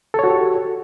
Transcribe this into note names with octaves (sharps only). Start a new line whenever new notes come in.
F#4 G4 A4 C#5